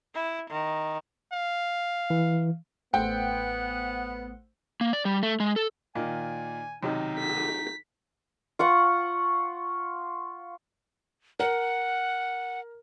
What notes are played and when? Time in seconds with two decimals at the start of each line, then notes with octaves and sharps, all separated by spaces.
0.14 E4
0.50 D#3
1.33 F5
2.10 E3
2.94 A1 A3 B3 C5 F#5 G5
4.81 A#3
4.93 D5
5.05 G3
5.23 A3
5.40 G#3
5.56 A4
5.95 A#2 D#3 A#3 G#5
6.83 B1 C3 D#3 D#4
7.19 B6
8.59 F4 F#5 C#6
11.40 A#4 F#5